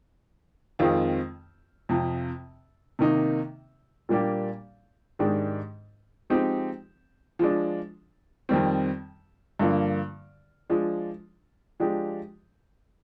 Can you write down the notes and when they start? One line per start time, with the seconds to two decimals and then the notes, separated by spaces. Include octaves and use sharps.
0.79 F2 D#3 G#3 C4 F4
1.89 F2 C3 F3
2.99 C3 D#3 A#3 D#4
4.09 A#2 G3 A#3 D4 G4
5.19 G#2 D#3 G#3 D4 G4
6.30 F3 G#3 C4 D#4 G4
7.39 F3 G#3 D4
8.49 F2 D#3 G3 C4
9.59 G2 D3 F3 A#3
10.70 F3 G#3 D4
11.80 F3 G#3 D4 G4